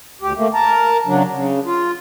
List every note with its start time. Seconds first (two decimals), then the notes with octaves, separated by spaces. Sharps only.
0.21 D2 G4
0.37 A3 A#3
0.54 A#4 A5 A#5
1.06 C#3 F#3 D4
1.32 C#3
1.66 F4